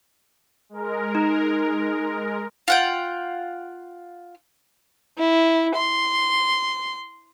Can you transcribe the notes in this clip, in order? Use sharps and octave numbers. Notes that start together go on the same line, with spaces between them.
G#3 A#4
D#4
F4 F#5 G5
E4
C6